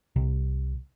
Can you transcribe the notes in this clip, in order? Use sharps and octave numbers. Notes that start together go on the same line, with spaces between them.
C2 C3